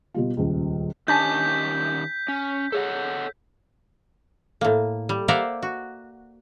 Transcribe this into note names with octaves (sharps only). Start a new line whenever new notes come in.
B2 G3 F4
D#1 C#2
D#3 C#4 D4 G4 G#5 A5 G6 B6
C#4
G#4 A4 C#5 F#5
A2 A#3
G3
A#3 C5 D5 E5 F#5 A#5
F#4